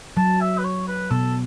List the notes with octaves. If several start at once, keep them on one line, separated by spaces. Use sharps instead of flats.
F#3 A5
E5
B4
C#5
B4
B2 A4